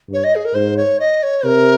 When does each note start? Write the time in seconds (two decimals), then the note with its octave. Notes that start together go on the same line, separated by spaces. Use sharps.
0.09 G2 C#5
0.23 D#5
0.35 G#4
0.44 A#4
0.54 G#2 C5
0.77 C#5
0.99 D#5
1.22 C#5
1.45 C3 A#4